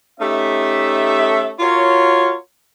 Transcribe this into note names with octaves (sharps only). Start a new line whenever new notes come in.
A3 C#4 D#4 G4 E5
F4 F#4 A#4 C#5